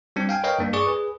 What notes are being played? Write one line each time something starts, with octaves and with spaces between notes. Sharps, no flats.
G3 C4 D4
F5 G5 G#5
A#4 B4 C#5 D#5 F5 G5
G2 A#3 D4
G#4 D5 C#6 D#6
G#4 B4